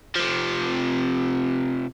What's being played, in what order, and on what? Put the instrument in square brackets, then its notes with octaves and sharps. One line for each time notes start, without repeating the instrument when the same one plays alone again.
[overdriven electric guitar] C3 F3